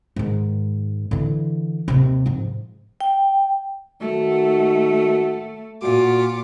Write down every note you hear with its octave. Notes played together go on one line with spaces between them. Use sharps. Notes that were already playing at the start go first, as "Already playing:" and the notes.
G#2 D#3
D3 E3
D#2 C3
G#2 F3
G5
D#3 A3 F#4
A#2 F4 F#4 D6